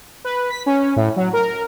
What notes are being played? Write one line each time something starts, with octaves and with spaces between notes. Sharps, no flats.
B4
B6
C#4
A2
F#3
A#4